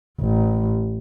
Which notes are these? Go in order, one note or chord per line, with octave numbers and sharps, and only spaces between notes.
A1